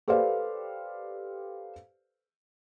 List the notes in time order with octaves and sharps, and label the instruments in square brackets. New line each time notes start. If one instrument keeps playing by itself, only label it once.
[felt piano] G4 A4 B4 C5 D5 F5